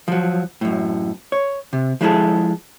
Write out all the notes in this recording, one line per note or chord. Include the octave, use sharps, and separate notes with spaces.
F3 F#3
F#2 A2
C#5
C3
F3 G#3 E4 G#4 A4